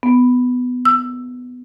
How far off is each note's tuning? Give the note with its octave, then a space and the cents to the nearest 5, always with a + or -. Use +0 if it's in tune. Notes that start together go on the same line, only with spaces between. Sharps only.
B3 +10
E6 +10